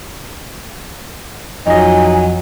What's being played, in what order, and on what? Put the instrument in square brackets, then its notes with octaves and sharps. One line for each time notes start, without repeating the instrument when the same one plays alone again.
[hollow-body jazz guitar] F2 D#5 [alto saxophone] F#3 [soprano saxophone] D#4 [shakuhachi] G#5